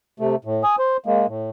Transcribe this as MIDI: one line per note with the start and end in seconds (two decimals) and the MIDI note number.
0.20 0.36 48
0.20 0.36 57
0.45 0.63 45
0.64 0.76 80
0.64 0.76 87
0.79 0.97 72
1.06 1.27 56
1.06 1.27 58
1.27 1.50 45